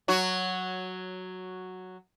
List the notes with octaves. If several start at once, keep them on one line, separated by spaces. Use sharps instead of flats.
F#3 F#4